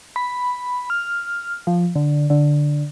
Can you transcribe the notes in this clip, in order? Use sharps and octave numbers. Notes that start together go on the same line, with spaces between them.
B5
F6
F3
D3
D3